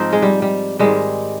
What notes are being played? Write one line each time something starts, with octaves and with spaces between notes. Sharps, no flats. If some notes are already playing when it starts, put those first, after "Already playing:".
Already playing: G#2 F3 C4 D#4 F4 G#4
G#3
G3
G3
G#2 D#3 G3 G#3